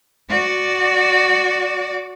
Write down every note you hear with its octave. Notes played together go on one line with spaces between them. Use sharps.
F#4 D5